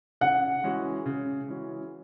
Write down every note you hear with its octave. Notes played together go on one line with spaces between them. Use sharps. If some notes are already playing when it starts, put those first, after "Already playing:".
C#3 F#5
E3 G#3 C#4 F#4
C#3
E3 G#3 C#4 F#4